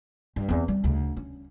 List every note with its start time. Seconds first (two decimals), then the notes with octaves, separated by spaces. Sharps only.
0.36 G2
0.49 E2 C4
0.68 G3
0.84 D2 C#3
1.17 C#4